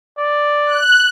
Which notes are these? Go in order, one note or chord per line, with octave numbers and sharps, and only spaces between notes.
D5
F#6